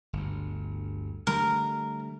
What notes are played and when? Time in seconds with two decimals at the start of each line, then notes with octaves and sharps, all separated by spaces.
0.13 G1 D2
1.27 D3 G3 A3 A#4